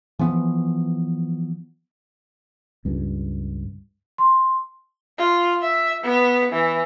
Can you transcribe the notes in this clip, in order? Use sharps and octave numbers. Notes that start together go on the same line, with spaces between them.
E3 F3 B3
C#2 G2
C6
F4
E5
B3
E3